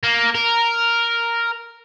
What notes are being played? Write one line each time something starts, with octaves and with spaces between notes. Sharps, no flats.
A#3
A#4